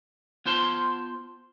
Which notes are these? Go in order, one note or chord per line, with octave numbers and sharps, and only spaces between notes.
B3 F4 C5 A5 C6